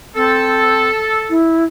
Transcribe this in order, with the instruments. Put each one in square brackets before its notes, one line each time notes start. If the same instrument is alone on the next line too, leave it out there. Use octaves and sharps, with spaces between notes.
[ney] C4 [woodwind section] A4
[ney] E4